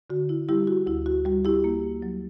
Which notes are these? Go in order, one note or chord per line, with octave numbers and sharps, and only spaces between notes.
D3 F#4
E4
G3 E4 G4
F#4
D2 E4
F#4
G3 F#4
E4 G4
A#3
F#3